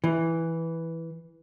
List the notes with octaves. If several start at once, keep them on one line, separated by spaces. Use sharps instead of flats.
E3